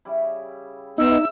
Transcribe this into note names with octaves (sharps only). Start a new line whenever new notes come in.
C#3 G3 E4
B3 D#4 E5 E6